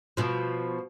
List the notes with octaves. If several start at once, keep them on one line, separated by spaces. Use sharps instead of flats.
B2 F3